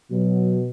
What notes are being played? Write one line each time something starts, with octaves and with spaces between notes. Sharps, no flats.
B2 F#3